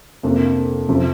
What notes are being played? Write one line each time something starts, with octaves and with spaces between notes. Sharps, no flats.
F2 C3 A#3 D4
F2 C3 F3 C4 F4